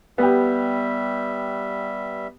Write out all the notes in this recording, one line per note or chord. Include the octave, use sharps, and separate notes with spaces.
G3 B3 G4 E5